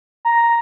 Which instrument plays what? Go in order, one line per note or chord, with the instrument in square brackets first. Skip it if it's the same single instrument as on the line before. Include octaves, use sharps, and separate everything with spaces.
[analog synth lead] A#5